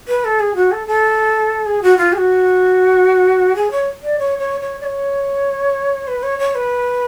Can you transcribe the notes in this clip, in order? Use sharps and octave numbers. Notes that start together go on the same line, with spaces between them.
B4
A4
G#4
F#4
A4
A4
G#4
F#4
F4
G#4
F#4
G#4
C#5
D5
C#5
C#5
C#5
D5
C#5
B4
C#5
C#5
B4